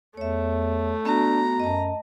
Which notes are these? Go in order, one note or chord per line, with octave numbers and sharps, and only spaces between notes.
E2 A3 C#5 E5
B3 D4 F#4 A#5
F#2 D#5 A5